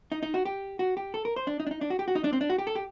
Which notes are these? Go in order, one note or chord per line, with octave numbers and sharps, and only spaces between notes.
D#4
D#4
F#4
G4
F#4
G4
A4
A#4
C5
D4
D#4
D4
D#4
D4
F#4
G4
F#4
D#4
D4
C4
D4
F#4
G4
A4
G4